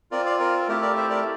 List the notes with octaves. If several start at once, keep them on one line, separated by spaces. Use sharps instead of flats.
C4 F4 A#4 D5
D5 F5
A#4
A3 E4 G4 A#4
A#4 D5
C5 E5
A#4 D5